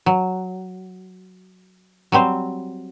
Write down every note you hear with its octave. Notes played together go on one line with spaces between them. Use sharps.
F#3
F#3 G3 C4 C5